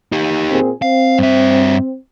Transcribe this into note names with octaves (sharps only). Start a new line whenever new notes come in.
D#4 G4
A#2 C4 G#4
C4 F5
G2 E5